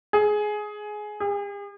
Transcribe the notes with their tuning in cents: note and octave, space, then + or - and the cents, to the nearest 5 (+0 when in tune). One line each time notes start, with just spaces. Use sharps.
G#4 +15
G#4 -45